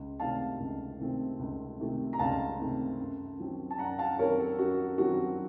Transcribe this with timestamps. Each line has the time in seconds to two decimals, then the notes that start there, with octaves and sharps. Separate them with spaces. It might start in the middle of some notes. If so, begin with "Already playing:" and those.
Already playing: C#2
0.20 C3 D#3 A3 C4 F5 A5
0.60 C#2
1.00 C3 D#3 A3 C4
1.39 C#2
1.80 C3 D#3 A3 C4
2.13 A#5
2.19 C#2 F5 A5
2.60 C3 D#3 A3 C4
2.99 F#2
3.39 D#3 F#3 C4
3.71 A5
3.78 F#2 F#5 A#5
3.99 F5 A5
4.18 D#3 F#3 C4 A#4 C#5
4.39 A4
4.59 F#2 F#4
4.98 D#3 F#3 C4 F#4